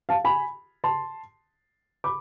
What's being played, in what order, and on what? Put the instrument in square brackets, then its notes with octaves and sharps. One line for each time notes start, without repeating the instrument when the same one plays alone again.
[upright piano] F5 A5
G#5 B5
A5 C6
B5 D6